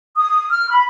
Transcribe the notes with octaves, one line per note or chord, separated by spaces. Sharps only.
D#6
F6
B5